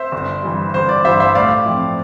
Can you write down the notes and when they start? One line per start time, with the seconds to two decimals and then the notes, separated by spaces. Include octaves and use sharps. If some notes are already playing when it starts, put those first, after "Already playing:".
Already playing: C5 E5
0.12 G1
0.43 G2 E3
0.74 G1 C5
0.89 D5
1.05 G2 E3 C5 E5
1.20 C5 E5
1.35 A2 D5 F5
1.66 F3 C4 E4